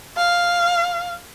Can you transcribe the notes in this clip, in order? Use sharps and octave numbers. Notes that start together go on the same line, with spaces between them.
F5